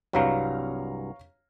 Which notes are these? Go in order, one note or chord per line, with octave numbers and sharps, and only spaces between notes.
C2 G2 F#3 C#5 F5 A#5